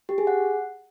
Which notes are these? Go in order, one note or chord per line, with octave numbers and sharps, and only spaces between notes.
G4
G#4
F#5